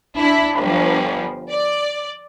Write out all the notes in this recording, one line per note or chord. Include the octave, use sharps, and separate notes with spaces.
D4 E4
G1 F3
D5